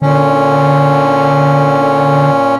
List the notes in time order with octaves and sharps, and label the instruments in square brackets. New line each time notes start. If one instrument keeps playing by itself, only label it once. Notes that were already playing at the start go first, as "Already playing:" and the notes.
[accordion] A#2 C#4 [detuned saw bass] D3